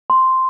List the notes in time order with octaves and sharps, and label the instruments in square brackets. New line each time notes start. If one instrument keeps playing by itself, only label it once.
[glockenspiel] C6